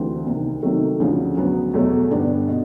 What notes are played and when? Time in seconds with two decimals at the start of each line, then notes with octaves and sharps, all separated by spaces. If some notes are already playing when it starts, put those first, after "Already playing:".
Already playing: D2 E3 G3 C4
0.26 C2 C3 D#3
0.63 C3 D#3 F#3 A3
1.00 D2 C#3 F3
1.37 D2 C#3 F#3 B3
1.74 E2 B2 F#3 A3
2.11 G2 D3 G3 B3 D4
2.48 B2